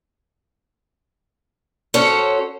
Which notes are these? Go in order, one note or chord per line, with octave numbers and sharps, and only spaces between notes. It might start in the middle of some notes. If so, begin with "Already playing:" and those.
C#4 F#4 A4 C5 C#5